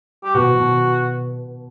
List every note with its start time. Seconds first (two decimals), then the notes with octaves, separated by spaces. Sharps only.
0.24 G4
0.34 B2 F#4
0.57 B2